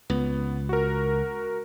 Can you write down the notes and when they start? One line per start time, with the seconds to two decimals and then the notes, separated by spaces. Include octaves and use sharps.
0.10 C#2 B3
0.69 F#4 A#4